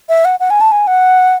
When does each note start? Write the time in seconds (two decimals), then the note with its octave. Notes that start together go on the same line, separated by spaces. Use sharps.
0.09 E5
0.25 F#5
0.40 F#5
0.50 G#5
0.61 A5
0.72 G#5
0.87 F#5